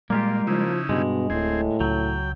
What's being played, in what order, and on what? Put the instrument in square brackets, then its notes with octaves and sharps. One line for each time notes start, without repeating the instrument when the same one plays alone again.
[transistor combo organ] A#2 [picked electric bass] G3 G#3 [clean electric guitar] A#3 F4 G4
[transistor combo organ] C#3 D#4 E4 [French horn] F3
[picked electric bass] G2 [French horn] B2 [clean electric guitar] G#3
[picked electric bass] D1 [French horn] A2 [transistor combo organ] C4 G#4
[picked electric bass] C#2 [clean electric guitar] F#3 [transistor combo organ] G5